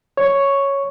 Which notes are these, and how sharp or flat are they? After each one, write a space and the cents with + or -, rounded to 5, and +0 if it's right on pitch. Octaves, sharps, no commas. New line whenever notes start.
C#5 +0 C#6 +0